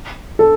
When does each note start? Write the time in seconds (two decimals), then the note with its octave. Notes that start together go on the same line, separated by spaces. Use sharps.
0.39 A4